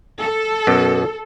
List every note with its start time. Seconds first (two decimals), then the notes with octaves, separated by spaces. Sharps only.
0.19 A4
0.67 F#2 B2